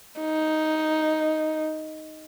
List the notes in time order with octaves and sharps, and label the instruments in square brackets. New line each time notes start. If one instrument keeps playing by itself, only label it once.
[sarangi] D#4